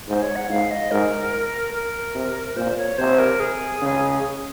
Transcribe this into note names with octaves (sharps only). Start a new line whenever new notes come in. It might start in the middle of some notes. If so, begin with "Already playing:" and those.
G#2 C5
C#5
F#5
G#2 F5
D#5
G#2 A#4
A#4
C3
A#2 C5
C#5
C3 C5
A#4
G#4
C#3